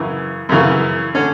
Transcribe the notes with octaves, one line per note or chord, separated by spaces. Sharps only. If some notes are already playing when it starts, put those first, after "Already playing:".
Already playing: F#2 C#3 E3
F#2 C#3 E3
D3 C#4